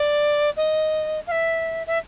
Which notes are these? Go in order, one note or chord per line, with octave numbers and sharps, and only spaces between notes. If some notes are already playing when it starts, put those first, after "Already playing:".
Already playing: D5
D#5
F5
E5
E5